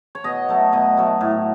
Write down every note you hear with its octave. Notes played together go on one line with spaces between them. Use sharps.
C#5
B2 D#5
F#3 A3
B2 D#5
F#3 A3
A2